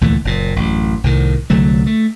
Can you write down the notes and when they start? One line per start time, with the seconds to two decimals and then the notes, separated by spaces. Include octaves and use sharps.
0.01 D2 A#2 E3 A3
0.25 F#1 A#2
0.56 A1 F#2
1.04 C2 A2 D#3
1.50 C2 D3 F#3 A3
1.86 A3